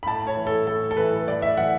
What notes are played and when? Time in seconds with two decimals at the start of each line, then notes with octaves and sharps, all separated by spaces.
0.03 B5
0.06 A2 A5
0.27 C#5
0.37 E3
0.47 A4
0.67 A2 A4
0.91 A4
0.97 E3 B4
1.28 A2 D5
1.42 E5
1.57 E3 F#5